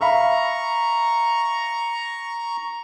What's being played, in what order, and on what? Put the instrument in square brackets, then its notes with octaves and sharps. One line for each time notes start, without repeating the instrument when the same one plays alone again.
[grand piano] E5 F5 B5 [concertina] A#5 C#6